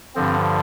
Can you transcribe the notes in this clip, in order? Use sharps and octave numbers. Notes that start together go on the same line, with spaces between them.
G2 D3 F3 C4